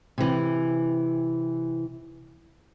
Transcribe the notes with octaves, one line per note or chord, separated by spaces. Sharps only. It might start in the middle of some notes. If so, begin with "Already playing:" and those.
C3 E3